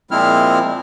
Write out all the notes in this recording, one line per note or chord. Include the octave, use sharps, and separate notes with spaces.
A#2 F3 G#3 C4 E4 F6